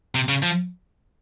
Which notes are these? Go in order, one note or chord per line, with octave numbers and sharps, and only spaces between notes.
C3
C#3
F3